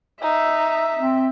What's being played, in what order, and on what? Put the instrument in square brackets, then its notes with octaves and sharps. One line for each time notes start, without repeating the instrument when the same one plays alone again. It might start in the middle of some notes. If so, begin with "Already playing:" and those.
[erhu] D#4 [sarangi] E5
[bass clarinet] C4